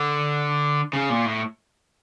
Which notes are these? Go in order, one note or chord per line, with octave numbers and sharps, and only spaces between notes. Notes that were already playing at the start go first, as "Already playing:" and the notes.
Already playing: D3
C#3
A#2
A2